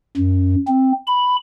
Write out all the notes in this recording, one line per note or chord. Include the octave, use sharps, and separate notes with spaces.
F#2
C4
B5